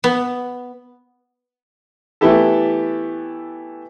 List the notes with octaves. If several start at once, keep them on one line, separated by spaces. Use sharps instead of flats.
B3
E3 A3 B3 E4 G4 A4